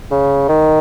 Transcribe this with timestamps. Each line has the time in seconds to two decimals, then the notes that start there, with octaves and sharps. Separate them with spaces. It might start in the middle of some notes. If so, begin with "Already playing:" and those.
0.11 C#3
0.49 D#3